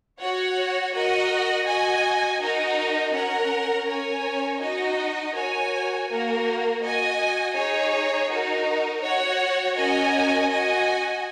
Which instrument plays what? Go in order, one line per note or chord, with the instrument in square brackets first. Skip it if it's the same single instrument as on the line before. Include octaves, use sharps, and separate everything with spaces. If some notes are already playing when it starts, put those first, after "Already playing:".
[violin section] F#4 C#5 F#5
F#4 A#4 D#5 F#5
F#4 D#5 G#5
D#4 F#4 A#4 D#5
C#4 A#4 F#5
C#4 A#4 C#5 G#5
D#4 F#4 D#5
F#4 A#4 C#5 G#5
A#3 F#4 A#4
F#4 D#5 G#5
D#4 G#4 C#5
D#4 F#4 A#4
F#4 C#5 F#5
C#4 F#4 A#4 D#5 G#5
F#4 D#5 G#5